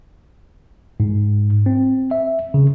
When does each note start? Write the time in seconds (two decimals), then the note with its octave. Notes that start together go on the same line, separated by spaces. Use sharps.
1.00 G#2
1.66 C4
2.11 E5
2.54 C#3